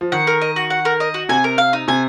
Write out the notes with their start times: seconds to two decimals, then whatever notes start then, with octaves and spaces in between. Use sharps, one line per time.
0.01 F3
0.12 D#3 F#5
0.27 A#4
0.41 D#5
0.56 F#4
0.70 F#5
0.85 A#4
1.00 D#5
1.14 F#4
1.29 C3 G#5
1.44 A#4
1.58 F5
1.73 D#4
1.88 C3 G#5